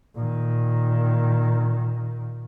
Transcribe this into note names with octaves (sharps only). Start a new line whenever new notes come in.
A#2 D#3